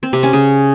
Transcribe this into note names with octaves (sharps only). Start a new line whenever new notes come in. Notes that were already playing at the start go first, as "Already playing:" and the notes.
C4
C3
C#4
C#3